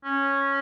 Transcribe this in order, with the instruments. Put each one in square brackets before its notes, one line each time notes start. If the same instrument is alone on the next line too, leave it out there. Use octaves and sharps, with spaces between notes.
[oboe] C#4